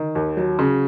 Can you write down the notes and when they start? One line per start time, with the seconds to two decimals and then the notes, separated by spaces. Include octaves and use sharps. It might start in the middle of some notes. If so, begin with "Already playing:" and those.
Already playing: D#3
0.15 D#2
0.37 F#3
0.59 C#3